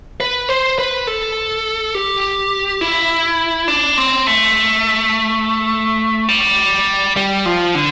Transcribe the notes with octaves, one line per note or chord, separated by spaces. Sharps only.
B4
C5
B4
A4
G4
E4
D4
C4
A3
G3
G3
F3
D3